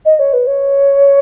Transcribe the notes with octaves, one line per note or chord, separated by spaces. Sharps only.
D#5
C#5
B4
C#5